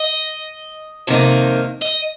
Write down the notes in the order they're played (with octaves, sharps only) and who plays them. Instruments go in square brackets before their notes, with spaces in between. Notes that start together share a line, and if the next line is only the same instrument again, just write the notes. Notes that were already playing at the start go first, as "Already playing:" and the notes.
Already playing: [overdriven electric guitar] D#5
[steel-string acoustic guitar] F2 C3 D#3 A#3 D#4
[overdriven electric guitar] D#5